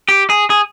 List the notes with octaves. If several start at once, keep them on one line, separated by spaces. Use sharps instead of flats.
G4
G#4
G#4